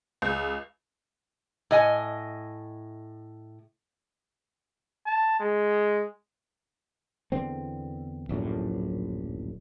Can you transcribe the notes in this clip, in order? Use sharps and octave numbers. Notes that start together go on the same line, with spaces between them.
C#2
A2 D#5 G#5
A5
G#3
E2 D3 B3 C4
D1 A#1 F#2 A2